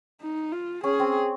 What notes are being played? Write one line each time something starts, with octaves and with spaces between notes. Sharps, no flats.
D#4
F4
C#4 G#4
C4